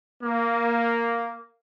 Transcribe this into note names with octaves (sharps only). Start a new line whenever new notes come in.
A#3